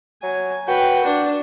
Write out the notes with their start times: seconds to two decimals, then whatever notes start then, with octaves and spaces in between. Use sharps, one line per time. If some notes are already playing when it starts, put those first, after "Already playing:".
0.23 F#3 G#5
0.68 F#4 B4 G5
1.04 D4